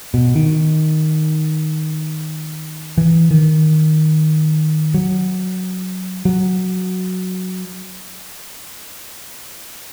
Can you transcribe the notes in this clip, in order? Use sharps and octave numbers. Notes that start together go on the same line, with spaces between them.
B2
D#3
E3
D#3
F#3
F#3